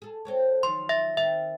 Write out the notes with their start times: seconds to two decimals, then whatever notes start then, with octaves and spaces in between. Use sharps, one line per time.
0.02 G#4 A4
0.25 C4 A4 C#5
0.63 D#3 F3 F#3 C6
0.89 E5 A#6
1.17 D#3 C4 E5